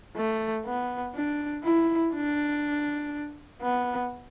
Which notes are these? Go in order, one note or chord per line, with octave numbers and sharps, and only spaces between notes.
A3
B3
D4
E4
D4
B3